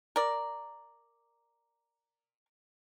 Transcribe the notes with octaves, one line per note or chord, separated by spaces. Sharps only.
A#4 D5